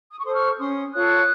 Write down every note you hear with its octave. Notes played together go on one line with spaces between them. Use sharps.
D#6
C#6
A4 C5 C6 D#6
C#6 F6
C#4 C6 D#6
F4 A4 C#5 D#6 F#6